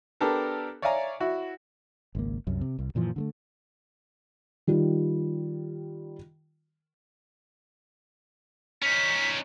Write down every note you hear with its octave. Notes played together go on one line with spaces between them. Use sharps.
B3 D4 G4 A4 A#4
C#5 D5 E5 F5 G#5 A#5
E4 F#4
G#1 C#2 A#3
C2 F#2
C3
C2
F#2 A#2 E3 F3
D3 G#3 A3
D#3 G3 F4
C#4 D#4 B6